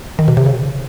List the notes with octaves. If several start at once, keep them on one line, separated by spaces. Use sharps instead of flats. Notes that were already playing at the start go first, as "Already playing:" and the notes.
D#3
B2
C3
C#3